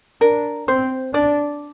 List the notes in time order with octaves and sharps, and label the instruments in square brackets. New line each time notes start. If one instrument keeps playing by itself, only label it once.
[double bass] D4 [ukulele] A#4
[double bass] C4 [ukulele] C5
[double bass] D4 [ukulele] D5